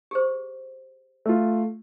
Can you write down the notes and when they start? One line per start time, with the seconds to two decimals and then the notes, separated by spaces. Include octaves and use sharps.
0.11 G4 G#4 C5
1.26 A3 F4